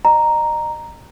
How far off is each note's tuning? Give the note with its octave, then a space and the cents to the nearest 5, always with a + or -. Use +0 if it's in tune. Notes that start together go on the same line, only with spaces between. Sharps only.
D#5 -40 A#5 +0